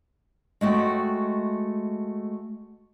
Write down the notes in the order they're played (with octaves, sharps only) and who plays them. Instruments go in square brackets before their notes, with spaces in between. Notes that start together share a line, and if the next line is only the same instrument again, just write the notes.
[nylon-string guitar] G#3 A3 F#4 C#5 G5